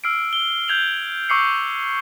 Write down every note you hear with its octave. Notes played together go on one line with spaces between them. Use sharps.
E6 F6 C7 D7
G7
G6 G#6 F7 F#7
C#6 D6 E6 C7 C#7